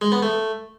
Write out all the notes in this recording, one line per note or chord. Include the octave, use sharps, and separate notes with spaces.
G#3
B3
A3